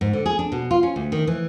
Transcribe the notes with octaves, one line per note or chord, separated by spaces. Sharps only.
G#2
D3
G#4
D4
B2
F4
C#4
D2
D#3
E3